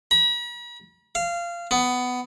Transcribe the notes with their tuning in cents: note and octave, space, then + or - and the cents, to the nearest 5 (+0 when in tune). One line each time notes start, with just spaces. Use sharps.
B5 -45
F5 -20
B3 +15